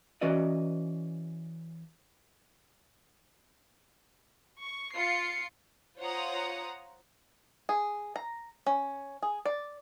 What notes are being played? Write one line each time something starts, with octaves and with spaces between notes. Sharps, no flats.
E3 C#4 F#4 B4 D5 D#5
C#6
F4 C7 C#7
F4 C5 C#5 F#5 A#5 D#6
G#4
A#5
C#4
G#4
D5